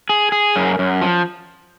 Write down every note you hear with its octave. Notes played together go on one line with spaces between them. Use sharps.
G#4
G#4
F#2
F#2
F3